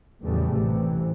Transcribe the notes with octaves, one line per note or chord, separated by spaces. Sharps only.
E2 A2 C#3 E3 G3 A3
A1 C3 E3